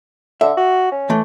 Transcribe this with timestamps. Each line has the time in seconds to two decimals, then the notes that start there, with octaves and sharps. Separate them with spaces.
0.41 D3 E5
0.57 F#4
0.92 C#4
1.10 E3 A3